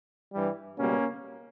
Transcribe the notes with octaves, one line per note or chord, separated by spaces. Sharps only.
G2 E3 G3
C#2 B2 G3 A#3 C#4